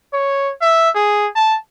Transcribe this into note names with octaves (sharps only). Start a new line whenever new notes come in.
C#5
E5
G#4
A5